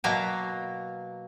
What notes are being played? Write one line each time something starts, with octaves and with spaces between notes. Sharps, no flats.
B2 F#3 A#3 E5 F5 A#5